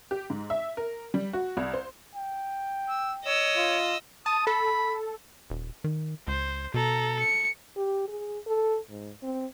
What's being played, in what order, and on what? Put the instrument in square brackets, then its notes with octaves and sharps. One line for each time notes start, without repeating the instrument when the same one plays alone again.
[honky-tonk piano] G4
G#2
E5
A#4
G3
F#4
C2
C5
[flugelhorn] G5
[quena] E6
[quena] C#5 [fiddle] D#5 E6
[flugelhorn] F4
[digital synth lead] A5 [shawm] D#6
[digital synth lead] A4 [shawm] B5
[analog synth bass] D#1
D#3
[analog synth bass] C#2 [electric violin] C5
[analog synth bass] B2 [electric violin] A4 A#5
[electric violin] C#7
[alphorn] G4
G#4
A4
G#2
C4